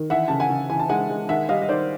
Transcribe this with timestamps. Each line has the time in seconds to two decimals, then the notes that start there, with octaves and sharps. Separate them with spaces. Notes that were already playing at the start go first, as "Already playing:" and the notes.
Already playing: D#3
0.10 E3 E5 F#5
0.28 C#3 A5
0.40 F#5 G#5
0.50 C#3
0.70 E3 G#5
0.79 A5
0.89 G#3 F#5 G#5
1.10 G#3
1.29 D#3 E5 F#5
1.49 G3 D#5 F5
1.62 D#5
1.69 D#3 C5 D5